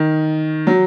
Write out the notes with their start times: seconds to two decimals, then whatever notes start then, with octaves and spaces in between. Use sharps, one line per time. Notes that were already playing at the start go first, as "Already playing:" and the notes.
Already playing: D#3
0.67 F#3